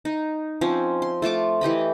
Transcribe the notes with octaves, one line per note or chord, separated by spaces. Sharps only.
D#4
F3 C4 C#4
C6
A3 F4 A5 D6
E3 G4 D#5 B5